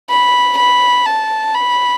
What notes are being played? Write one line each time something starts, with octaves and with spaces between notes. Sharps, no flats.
B5
B5
A5
B5